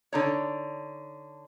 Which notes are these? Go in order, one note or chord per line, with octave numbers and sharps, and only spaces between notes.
D3 D#4 C#5